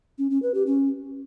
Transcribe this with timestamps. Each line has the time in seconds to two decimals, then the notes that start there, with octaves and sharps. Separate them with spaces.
0.18 C#4
0.30 C#4
0.42 B4
0.54 G4
0.66 C#4